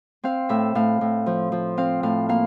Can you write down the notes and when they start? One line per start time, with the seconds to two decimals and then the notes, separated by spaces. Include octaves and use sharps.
0.24 C4 F5
0.49 A2 E5
0.75 A2 F5
1.01 A2
1.26 F3
1.52 F3
1.77 C4 F5
2.03 A2 F5
2.29 A#3 F5